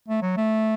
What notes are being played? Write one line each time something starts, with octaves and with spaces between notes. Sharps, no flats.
A3
F#3
A3